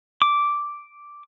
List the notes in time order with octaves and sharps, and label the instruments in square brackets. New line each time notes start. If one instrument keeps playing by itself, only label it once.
[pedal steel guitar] D6